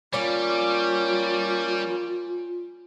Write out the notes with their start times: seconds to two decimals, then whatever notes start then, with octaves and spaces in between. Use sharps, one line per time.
0.13 G3 A#3 C#4 F4 C#5 D5 F5